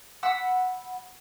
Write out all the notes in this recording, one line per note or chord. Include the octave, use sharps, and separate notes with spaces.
F#5 B5 E6